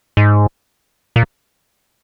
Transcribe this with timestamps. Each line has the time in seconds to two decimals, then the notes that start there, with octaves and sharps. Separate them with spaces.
0.17 G#2
1.16 A#2